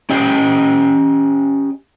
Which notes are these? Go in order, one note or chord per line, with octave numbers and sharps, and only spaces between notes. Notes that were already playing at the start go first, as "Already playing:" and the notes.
C#4 G4 D#5 G5